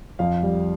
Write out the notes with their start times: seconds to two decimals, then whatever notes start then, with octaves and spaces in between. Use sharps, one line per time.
0.19 F2 F5
0.43 G3